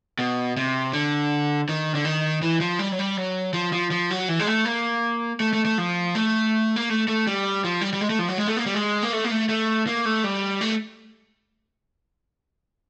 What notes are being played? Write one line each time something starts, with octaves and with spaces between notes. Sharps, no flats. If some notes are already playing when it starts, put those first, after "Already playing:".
B2
C3
D3
D#3
D3
D#3
E3
F3
G3
F#3
G3
F#3
F3
F3
F3
F#3
E3
G#3
A3
A#3
A3
A3
A3
F3
A3
A#3
A3
A3
G3
F3
G3
G3
G#3
A3
F3
F#3
G#3
A3
A#3
G3
G#3
A#3
A3
A#3
A3
A3
A#3
A3
G3
A3